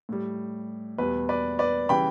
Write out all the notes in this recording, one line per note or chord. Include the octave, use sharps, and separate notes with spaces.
A2 G3
E2 B2 G3 B4
B4 D5
B4 D5
C#3 E3 G3 G5 B5